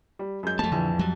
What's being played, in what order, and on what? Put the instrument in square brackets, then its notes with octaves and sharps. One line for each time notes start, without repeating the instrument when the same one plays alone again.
[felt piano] G3
F#2 G#3 G6
[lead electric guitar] F2 A5 [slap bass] A3 A#3
[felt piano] A#1 E3 [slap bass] D3
[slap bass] F#3 G3